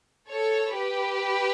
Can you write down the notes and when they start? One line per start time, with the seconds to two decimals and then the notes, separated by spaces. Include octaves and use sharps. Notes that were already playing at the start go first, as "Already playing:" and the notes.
0.28 A4 C#5
0.76 G4 B4